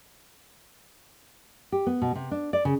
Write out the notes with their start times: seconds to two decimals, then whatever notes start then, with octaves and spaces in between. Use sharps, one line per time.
1.72 G4
1.86 B3
2.02 B2
2.15 C3
2.31 D4
2.53 D5
2.65 C#3